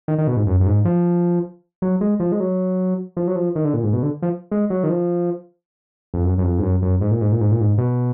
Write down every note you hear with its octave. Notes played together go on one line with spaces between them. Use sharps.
D#3
D#3
B2
G#2
F#2
F#2
G#2
F3
F#3
G#3
F3
G#3
F#3
F3
F#3
F3
D#3
D3
A#2
G#2
B2
D3
F3
G#3
F#3
D#3
F3
F2
F#2
F#2
F2
G#2
F#2
F#2
G#2
A#2
G#2
A#2
G#2
A#2
G#2
B2